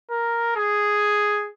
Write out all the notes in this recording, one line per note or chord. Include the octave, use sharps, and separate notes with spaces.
A#4
G#4